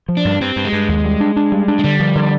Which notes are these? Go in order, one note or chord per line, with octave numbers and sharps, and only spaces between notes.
F3
D4
G2
G2 C4
G2
G#3
G2
D#2
G3
D4
D4
G3
D4
G#3
D3 G3
F3
D3